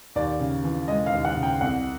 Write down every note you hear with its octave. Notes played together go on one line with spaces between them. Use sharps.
D#2 D5
C#3
E3
G#3 D#5
F5
D#2
F#5
C#3
G5
C2 F#5